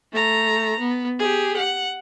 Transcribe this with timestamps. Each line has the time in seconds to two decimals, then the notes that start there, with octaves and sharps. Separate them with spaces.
0.12 A3 A#5
0.79 B3
1.19 G4 G#4
1.57 F#5